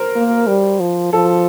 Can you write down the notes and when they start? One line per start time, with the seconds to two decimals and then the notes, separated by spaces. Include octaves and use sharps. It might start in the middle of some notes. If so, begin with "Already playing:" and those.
Already playing: A#4 C5
0.16 A#3
0.47 G3
0.80 F3
1.13 F3 A4